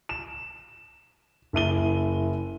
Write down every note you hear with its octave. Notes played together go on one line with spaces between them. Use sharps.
E7
F#1 E4 D#7 G7